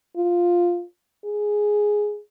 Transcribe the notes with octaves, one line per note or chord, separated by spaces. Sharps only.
F4
G#4